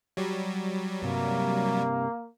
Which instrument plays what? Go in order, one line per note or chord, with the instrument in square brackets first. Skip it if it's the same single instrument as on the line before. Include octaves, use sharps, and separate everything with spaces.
[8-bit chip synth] F#3 G3
[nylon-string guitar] G2 C3 [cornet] A#3